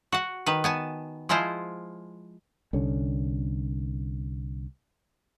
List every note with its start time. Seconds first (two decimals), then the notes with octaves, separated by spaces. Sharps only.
0.12 F#4 F#5
0.46 D#3 B4
0.64 B3 G#5 A5
1.29 F3 G#3 E4 F4 C5
2.73 C2 D3 C#4